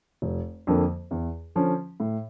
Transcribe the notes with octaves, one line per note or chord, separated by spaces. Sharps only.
F1
F2 D3 F3 A#3
E2
D3 F3 C#4
A2